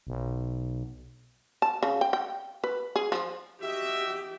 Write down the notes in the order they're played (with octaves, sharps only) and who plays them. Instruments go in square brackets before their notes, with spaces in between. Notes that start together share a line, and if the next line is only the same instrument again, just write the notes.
[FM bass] B1
[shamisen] A5
C#3
G5
G5
B4
G#4
F3
[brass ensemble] F#4 D#5 E5 [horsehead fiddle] G4